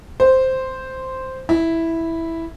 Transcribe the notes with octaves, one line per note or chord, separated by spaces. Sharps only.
C5
E4